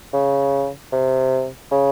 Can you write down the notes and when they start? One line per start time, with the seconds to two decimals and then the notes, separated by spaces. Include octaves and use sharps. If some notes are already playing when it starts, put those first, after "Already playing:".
0.13 C#3
0.92 C3
1.71 C#3